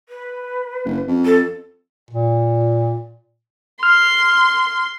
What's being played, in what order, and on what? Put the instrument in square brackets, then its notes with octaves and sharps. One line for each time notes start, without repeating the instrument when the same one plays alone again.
[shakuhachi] B4
[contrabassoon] F#1
F2
[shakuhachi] A4
[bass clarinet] A#2
[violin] C6 [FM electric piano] F6